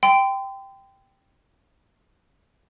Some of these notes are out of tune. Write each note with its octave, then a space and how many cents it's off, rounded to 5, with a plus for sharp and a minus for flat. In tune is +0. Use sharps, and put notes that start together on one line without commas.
G5 +0 C6 -35